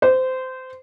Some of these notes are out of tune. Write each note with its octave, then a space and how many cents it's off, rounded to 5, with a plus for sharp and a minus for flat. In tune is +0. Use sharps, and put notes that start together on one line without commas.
C5 -20